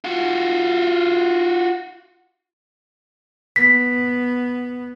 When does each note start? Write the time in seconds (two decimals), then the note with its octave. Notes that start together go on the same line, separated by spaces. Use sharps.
0.04 F4 F#4
3.56 B3 B6